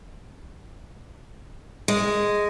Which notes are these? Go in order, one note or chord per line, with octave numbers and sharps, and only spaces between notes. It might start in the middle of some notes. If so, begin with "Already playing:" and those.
G#3